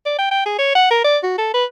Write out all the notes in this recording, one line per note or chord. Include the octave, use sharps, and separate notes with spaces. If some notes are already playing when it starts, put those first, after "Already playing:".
D5
G5
G5
G#4
C#5
F#5
A#4
D5
F#4
A4
B4